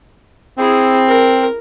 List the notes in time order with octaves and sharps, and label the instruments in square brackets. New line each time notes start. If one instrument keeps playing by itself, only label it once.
[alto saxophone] C4 [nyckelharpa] E4 G#4
[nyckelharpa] A#4